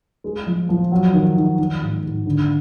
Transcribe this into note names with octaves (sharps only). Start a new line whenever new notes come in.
G#3
F3
F3
F#3
D#3
D#3
D#3
G#2
G#2
D3